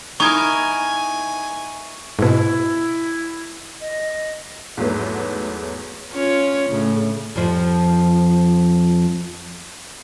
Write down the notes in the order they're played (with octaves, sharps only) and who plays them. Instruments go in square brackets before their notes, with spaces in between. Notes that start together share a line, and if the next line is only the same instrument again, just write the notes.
[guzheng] D#4 E4 A#4 [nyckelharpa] G#5 [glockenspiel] C#6 G#6
[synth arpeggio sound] G#2 B2 [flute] E4
[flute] D#5
[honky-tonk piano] E2 G#2 F#3 A3 B3
[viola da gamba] C#4 F4 C#5
A2 C#3
[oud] F2 F3